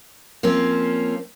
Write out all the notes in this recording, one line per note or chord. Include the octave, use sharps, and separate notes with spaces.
F3 A#3 C4 C#4